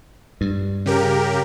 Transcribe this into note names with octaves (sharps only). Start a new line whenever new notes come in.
G2
C#3 G4 A#4